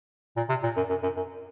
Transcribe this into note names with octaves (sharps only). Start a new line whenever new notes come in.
A#2
C3
A#2
F#2
F#2
F#2
F#2